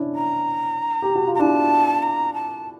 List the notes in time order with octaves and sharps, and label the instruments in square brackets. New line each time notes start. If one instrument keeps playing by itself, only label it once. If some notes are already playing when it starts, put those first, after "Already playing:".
Already playing: [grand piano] C#4 D4 E4
[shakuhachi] A#5
[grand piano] G4
F#4
F4
[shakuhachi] A#5
[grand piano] D4 E4 [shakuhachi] A5
[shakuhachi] A#5
A5